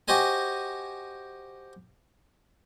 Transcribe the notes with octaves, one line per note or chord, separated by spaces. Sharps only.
F#4 G4 C5 D#5 G#5